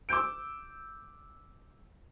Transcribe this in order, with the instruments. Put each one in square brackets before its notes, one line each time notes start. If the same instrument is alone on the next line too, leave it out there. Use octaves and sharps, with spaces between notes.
[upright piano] D6 E6 G6 D7